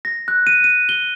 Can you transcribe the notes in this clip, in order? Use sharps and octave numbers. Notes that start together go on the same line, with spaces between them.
A#6
F#6
D#7
D#7
G7